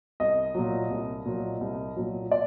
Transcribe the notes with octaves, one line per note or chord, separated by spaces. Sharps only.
C2 D#5
A#2 F#3
C2
A#2 F#3
C2
A#2 F#3
D5